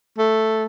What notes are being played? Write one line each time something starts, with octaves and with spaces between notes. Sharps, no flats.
A3